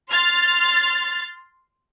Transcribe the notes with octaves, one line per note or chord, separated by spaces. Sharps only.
C6 F6 A6